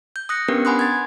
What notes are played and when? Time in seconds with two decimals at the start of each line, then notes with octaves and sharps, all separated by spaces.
0.16 G6
0.29 D#6 F#6 A#6 C#7
0.48 B3 C#4 D4 G4 A#4 B4
0.65 F#5 G#5 B5 C6 D#6 F#6
0.79 G#6 A6